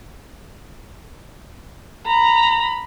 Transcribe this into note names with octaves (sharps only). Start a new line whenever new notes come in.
A#5 B5